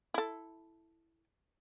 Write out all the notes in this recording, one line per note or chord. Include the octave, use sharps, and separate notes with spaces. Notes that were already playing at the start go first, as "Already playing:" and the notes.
E4 A4